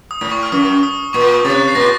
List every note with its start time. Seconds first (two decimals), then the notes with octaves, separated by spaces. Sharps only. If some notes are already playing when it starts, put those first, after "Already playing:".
0.11 D#6
0.21 A2
0.31 C#6
0.43 F6
0.52 F#2 D#6
0.83 D#6
1.13 A#2 C#6
1.28 C#6
1.34 D#6
1.45 C3 A6
1.55 F#6
1.68 C7
1.75 A#2 A#6